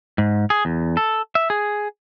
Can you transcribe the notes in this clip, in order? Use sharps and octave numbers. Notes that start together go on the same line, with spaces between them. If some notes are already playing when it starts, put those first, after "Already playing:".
G#2
G#4
E2
A4
E5
G#4